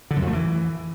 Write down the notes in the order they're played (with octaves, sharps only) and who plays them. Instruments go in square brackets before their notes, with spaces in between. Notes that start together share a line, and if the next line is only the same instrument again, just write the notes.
[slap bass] D3
F#2
F2
A3
E3